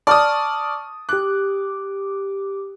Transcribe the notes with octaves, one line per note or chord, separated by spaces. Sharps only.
D5 A5 C#6 D#6 F6
G4 D6 F#6